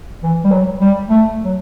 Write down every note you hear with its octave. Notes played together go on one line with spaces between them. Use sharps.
E3
G3
F#3
G3
A3
F#3